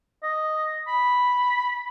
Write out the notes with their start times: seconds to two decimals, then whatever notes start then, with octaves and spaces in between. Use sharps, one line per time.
0.23 D#5
0.87 B5